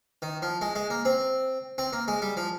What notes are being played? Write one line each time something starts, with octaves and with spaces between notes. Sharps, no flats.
D#3
F3
G#3
G#3
A#3
C4
C4
A#3
G#3
G3
F3